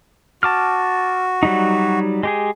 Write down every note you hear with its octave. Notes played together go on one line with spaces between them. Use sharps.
F#4 A5 D6 F6
F#3 G3 D#4
G#3 G4 G#4